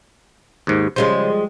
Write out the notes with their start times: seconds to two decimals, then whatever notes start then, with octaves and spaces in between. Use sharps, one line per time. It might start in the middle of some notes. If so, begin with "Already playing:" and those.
0.67 D#2 G#2
0.96 C#3 F3 G3 G#3 C5